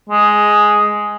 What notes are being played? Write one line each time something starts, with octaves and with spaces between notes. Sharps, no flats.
G#3